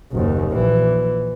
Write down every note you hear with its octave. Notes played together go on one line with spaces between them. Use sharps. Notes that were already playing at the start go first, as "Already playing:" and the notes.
F#1 D#2
A#1 E3